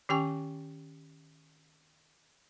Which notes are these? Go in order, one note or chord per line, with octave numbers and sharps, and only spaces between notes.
D#3 C#4 G4 G5 G#5 C#6